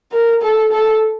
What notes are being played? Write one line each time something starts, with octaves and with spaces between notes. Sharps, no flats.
A#4
A4
A4